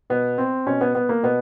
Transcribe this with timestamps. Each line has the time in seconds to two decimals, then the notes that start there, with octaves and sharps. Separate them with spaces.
0.10 B2 B3
0.38 C4
0.67 B2 C#4
0.81 B3
0.95 B3
1.09 A#3
1.23 B2 B3